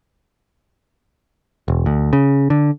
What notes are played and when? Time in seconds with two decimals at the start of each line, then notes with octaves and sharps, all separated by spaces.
1.68 E1
1.86 D2
2.13 C#3
2.50 D3